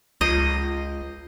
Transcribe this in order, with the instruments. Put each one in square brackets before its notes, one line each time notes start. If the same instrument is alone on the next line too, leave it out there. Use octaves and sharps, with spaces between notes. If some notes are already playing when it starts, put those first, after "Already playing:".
[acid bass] C#2 [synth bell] F4 G6 C7 [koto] D#5